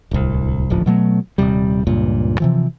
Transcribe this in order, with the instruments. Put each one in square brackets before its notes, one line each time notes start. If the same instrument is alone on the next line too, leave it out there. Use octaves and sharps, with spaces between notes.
[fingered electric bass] D1 C2
D#1 A1 D2 F3
B2 F#3 A3
D#1 A#1 C3 G3
C#2 G2 A#2
C3 E3 F3